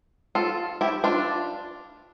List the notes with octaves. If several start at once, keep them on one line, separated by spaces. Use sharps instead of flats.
F4 A4
E4 G4
D4 F4